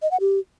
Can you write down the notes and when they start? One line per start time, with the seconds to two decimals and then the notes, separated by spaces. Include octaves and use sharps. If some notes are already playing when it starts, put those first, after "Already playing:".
0.02 D#5
0.11 F#5
0.20 G4